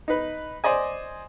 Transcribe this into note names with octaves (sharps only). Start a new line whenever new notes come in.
D#4 B4
C5 D5 D#5 G#5